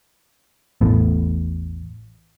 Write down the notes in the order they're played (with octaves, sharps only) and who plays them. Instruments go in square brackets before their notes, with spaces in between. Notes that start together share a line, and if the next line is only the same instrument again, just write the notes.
[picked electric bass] A1 E2 A2